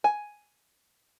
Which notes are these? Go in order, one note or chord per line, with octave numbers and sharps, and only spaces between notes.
G#5